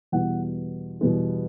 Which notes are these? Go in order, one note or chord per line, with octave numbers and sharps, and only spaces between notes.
E2 B2 G3 B3 F#5
E2 B2 G3 B3